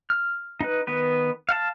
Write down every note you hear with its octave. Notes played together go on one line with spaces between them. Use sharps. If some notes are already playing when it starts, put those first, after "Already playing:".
F6
D#4 B4
D#3 B3 B4
F5 F#5 A5